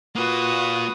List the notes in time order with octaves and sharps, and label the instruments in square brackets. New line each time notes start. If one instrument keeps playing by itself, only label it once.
[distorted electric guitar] A#3 F4 [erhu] F#4 [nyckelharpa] B4 D#6